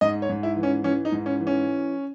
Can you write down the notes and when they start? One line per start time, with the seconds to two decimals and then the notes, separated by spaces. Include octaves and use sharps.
0.01 G#2 D#5
0.22 C#5
0.29 G#2
0.43 E4
0.57 E3
0.63 C#4
0.84 E3 C#4
1.05 D#4
1.12 G#2
1.26 C#4
1.40 E3
1.47 C#4